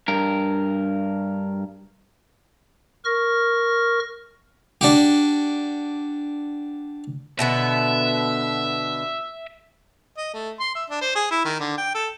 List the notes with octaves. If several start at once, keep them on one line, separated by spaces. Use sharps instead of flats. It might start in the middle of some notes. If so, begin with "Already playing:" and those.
G2 A#4
A#4 C#6 F6 A#6
D4 F#4 G4
B2 D3 B3 E5
D#5
A3
C6
E5
D4
C5
G#4
E4
D#3
D3
G5
A4